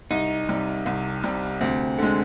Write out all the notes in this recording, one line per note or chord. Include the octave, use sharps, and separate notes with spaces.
C2 D#4
C3 G3
C2
C3 G3
D2 C4
D3 G#3